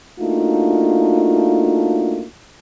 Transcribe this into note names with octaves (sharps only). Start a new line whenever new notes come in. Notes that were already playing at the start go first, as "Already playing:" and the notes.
A3 A#3 D4 D#4 F4 F#4